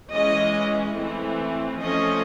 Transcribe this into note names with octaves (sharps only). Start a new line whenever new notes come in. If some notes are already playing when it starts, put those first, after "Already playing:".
E3 G#3 C#4 D#5
E3 A3 C4
F3 A3 C#4 D#5